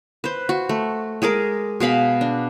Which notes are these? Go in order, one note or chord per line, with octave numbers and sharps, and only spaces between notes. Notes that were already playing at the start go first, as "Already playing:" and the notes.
B4 C5
F#4
A3
G#3 G#4 A#4 D6
B2 G#4 F5 B5
D4